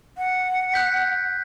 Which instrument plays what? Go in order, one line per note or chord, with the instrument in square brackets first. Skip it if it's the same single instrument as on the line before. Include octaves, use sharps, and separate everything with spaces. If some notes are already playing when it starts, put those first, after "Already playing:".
[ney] F#5
[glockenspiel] F#6 G6 B6